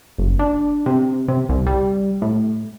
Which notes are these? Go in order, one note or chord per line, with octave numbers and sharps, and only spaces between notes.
F#1
D4
C3
C3
C2
G3
A2